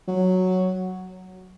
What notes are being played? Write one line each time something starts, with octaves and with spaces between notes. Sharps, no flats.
F#3